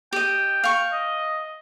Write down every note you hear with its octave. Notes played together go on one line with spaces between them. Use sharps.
G4 D#5 G5
F5 C#6
D#5